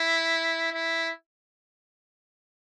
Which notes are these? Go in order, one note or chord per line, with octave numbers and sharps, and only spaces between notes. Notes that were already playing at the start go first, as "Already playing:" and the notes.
Already playing: E4
E4